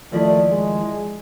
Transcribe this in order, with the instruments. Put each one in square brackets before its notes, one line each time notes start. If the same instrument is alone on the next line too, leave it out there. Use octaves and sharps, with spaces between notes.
[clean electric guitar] D#2 F3 E4 [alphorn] A3 [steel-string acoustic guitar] D4 D5 D#5
[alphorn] G#3